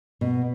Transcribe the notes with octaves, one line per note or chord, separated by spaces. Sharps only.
B2